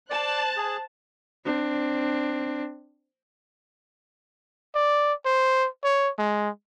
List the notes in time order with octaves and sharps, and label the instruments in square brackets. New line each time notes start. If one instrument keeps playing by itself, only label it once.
[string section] C5 A5 F#6 [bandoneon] D5
[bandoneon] G#4
[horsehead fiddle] C4 D4
[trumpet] D5
C5
C#5
G#3